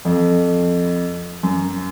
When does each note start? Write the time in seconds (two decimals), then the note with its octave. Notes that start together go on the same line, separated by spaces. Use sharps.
0.05 F2
1.43 F#2